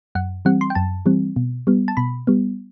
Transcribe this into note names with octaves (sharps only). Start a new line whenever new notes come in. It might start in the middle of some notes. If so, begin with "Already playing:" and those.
F#2 F#5
E3 G3 C4 F#5
C6
G5
F#2 A5
E3 G3 C4
B2
G3 B3
A5
B2 B5
G3 B3